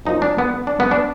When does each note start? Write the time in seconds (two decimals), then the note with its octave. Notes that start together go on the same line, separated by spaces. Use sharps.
0.05 F#2 F3 A#3 D#4
0.22 D4
0.38 B3
0.67 D4
0.80 B3
0.91 D4